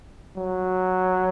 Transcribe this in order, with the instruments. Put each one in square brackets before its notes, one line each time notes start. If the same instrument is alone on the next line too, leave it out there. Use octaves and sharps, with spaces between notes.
[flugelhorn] F#3